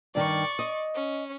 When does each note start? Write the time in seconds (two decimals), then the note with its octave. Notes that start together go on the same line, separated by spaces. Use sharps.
0.15 G2 D#3 D5 C#6
0.59 D#5
0.95 C#4